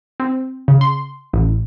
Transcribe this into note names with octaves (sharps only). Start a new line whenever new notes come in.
C4
C#3
C6
A1